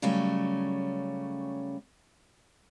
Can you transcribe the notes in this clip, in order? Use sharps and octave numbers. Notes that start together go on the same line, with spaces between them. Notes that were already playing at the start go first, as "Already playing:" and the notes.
C#3 F#3 G3 A3 C#4